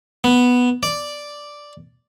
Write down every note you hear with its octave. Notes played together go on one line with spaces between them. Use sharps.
B3
D5